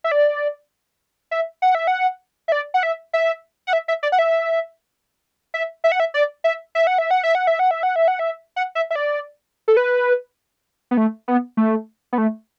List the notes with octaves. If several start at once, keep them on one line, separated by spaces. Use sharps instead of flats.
E5
D5
E5
F#5
E5
F#5
E5
D5
F#5
E5
E5
F#5
E5
E5
D5
F#5
E5
E5
E5
F#5
E5
D5
E5
E5
F#5
E5
F#5
E5
F#5
E5
F#5
E5
F#5
E5
F#5
E5
F#5
E5
E5
D5
A4
B4
B3
A3
B3
A3
B3
A3